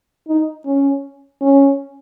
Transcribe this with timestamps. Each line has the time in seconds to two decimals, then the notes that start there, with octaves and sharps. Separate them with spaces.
0.28 D#4
0.66 C#4
1.42 C#4